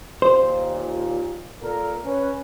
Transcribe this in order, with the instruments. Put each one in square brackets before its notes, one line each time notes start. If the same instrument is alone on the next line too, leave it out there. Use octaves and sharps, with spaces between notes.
[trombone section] D#2 A#2 [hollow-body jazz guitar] C5
[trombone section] A#2 A4 A#4
C#4 B4